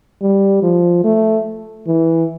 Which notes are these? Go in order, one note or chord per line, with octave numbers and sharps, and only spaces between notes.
G3
F3
A3
E3